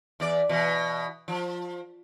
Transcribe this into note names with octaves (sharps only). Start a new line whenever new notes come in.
E2 D5
B2 E3
F3